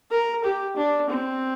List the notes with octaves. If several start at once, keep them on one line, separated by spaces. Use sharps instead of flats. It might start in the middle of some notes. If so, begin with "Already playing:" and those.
A#4
G4
D4
C4